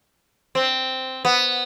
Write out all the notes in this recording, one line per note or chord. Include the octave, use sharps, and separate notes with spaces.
C4
B3